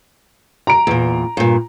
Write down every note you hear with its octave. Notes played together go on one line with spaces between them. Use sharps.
A#5 D7
E2 A#2
G2 A#2